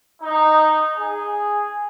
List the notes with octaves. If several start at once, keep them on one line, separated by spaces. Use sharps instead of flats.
D#4
G#4